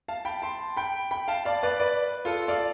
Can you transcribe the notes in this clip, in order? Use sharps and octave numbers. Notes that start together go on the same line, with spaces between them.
F5 A5
G5 B5
A5 C6
G5 B5
G5 B5
F5 A5
D5 F5
B4 D5
B4 D5
F4 A4
D5 F5